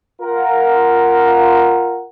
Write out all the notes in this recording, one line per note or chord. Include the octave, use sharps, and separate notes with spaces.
F4 A#4 F#5